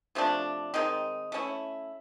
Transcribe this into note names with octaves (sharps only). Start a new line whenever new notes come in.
C3 F3 A3 D4
D#3 G#3 C4 D#4
A3 C#4 E4